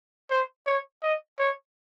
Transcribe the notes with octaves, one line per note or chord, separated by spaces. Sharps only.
C5
C#5
D#5
C#5